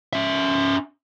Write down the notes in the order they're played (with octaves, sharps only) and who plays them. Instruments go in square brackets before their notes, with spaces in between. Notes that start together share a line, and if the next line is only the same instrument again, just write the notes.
[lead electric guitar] C#4 E5